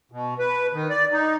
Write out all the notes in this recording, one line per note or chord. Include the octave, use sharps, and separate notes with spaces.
B2
B4
D#3
D5
D#4